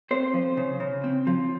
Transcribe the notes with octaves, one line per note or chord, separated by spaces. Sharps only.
C4 C5
F3
C#3
C#3
C4
F3